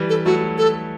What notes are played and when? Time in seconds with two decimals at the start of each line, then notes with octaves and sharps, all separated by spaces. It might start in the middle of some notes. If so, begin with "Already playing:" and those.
Already playing: E3 G3
0.09 A4
0.25 F#3 A3 F#4
0.58 A4